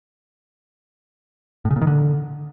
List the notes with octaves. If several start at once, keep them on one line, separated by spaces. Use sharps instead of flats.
A2
C#3
A#2
D#3
D3